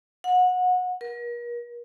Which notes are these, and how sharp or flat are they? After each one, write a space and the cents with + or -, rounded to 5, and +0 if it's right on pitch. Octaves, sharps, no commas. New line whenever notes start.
F#5 -25
A#4 +40